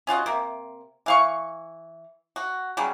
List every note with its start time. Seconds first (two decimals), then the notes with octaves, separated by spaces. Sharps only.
0.07 C#4 F4 F#4 D#5
0.26 C3 A#3
1.06 E3 F5 C#6
2.36 F#4
2.77 C#3 F#3 G3